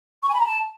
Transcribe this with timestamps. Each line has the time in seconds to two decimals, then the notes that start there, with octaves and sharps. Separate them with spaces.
0.22 C#6
0.27 G#5
0.33 B5
0.38 A#5
0.44 A5